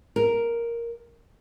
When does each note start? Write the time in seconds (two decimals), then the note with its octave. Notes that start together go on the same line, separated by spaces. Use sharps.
0.16 A#4